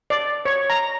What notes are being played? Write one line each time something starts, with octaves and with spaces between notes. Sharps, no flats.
D5
C#5
A#5